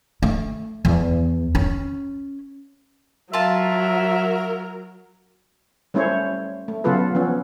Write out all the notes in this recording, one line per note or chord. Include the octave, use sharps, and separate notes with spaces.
A3
E2
C#4
F#3 F4 A#4 E5 A5
G3 A3 C#4 E4 C5 C#5
A3
C#3 F#3 B3 F4 A4 B4
F3 B3 C#4